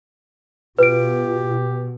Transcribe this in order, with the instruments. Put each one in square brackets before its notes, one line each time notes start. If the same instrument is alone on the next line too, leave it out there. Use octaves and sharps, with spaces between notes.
[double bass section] B2 [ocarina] F4 [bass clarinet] G4 [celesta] B4 D7